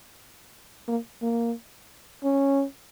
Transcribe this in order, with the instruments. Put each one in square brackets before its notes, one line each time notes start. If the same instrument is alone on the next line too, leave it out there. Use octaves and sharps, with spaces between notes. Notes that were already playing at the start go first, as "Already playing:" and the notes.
[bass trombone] A#3
A#3
C#4